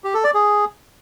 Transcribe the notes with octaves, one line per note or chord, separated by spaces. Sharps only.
G4
A4
D5
G#4